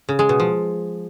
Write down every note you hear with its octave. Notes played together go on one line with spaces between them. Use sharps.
C#3
G#3
B2
F3